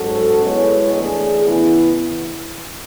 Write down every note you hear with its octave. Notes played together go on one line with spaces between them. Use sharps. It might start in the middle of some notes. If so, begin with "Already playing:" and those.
Already playing: G#2 F#3 C#4 F#4 A4
G#3 B3 E4 G#4 C#5
E3 A3 D4 G#4
E2 C#3 E3 B3 E4